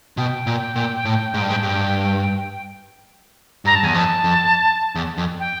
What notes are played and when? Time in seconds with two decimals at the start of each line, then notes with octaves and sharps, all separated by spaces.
0.17 B2 G5
0.47 A#2
0.76 A#2
1.05 A2
1.34 G#2
1.42 G2
1.50 G#2
1.63 G2
3.65 G2 A#5
3.75 A5
3.83 E2 G#5
3.94 F2 A5
4.24 F2
4.95 E2
5.18 F2
5.39 G5